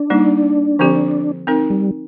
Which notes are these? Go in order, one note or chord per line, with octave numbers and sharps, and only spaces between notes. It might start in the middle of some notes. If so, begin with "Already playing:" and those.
Already playing: D4
G3 A#3 D#4
D3 F3 C4 G4
C4 D#4 A#4
G3